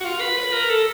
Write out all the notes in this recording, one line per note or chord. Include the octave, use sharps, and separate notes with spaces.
F#4
F4
B4
B4
A#4
A4